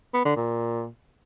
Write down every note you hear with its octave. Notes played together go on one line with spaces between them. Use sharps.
B3
D3
A#2